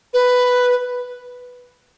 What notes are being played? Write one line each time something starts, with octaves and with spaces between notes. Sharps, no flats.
B4